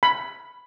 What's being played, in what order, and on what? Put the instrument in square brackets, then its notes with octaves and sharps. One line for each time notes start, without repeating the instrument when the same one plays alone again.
[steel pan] B5